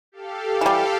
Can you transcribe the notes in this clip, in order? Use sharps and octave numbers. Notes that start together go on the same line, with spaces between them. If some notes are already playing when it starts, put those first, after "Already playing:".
G4 A4 F5
E3 G3